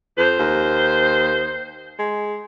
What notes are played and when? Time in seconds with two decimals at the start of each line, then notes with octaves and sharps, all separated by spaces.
0.18 F2 C5
0.39 D#2
1.99 G#3